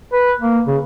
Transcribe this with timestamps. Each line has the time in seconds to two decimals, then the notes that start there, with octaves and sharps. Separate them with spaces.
0.13 B4
0.40 A#3
0.67 C#3